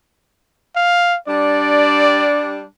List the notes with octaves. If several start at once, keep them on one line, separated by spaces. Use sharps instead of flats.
F5
G3 D4 D5